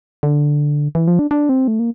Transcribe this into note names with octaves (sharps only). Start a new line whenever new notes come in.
D3
E3
F3
D4
D4
C4
A3
A#3